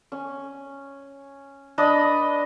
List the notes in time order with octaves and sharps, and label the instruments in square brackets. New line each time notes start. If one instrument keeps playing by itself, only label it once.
[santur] C#4
D4 B4 D#5 B5